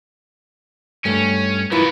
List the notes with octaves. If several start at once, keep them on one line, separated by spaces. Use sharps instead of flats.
G2 A3 C#4
D#3 B3 E4 F4 B4